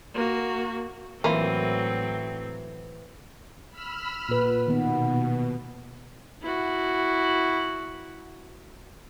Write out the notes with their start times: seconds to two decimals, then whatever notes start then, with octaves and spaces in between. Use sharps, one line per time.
0.14 A#3 F#4
1.24 A2 E3 F#3 A#3 C4 E4 F4
3.71 B5 E6 F6
4.29 A#2 B4
4.67 B2 D#3 B3
6.42 E4 F#4